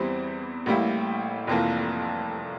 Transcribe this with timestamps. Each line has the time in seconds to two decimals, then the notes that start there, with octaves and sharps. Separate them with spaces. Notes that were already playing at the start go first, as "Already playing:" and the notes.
Already playing: E2 E3 G3 C4 E4
0.66 A1 A2 G3 A#3 E4
1.47 F1 F2 E3 A#3